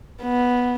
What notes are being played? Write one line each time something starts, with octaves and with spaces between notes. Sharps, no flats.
B3